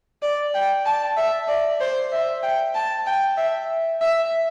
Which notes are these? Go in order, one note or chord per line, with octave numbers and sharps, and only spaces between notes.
D5
G5
A5
E5
D5
C5
E5
G5
A5
G5
E5
E5